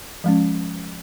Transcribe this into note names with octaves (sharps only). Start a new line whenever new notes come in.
F3 G#3 C#4